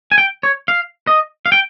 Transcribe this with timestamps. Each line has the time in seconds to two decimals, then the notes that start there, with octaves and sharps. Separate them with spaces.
0.12 G#5
0.18 G5
0.43 C#5
0.68 F5
1.07 D#5
1.46 F5
1.52 G5